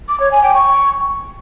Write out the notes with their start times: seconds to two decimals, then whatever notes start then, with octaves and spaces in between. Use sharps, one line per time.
0.09 D6
0.20 C#5
0.32 G#5
0.43 G5
0.54 C#6